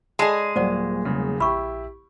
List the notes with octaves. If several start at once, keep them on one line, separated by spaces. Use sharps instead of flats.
G#3 G#4 D5 D#5 G5 A5 E7
D#1 F#3 G3 A#3 C5 D5 F#5
E1 C#3
A#1 E4 G4 B5 C#6 E6